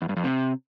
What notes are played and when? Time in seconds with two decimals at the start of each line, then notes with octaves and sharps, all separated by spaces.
0.02 E2
0.09 G2
0.16 F2
0.24 C3